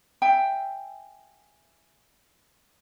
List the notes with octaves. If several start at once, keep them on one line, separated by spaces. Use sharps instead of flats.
E5 G5 G#5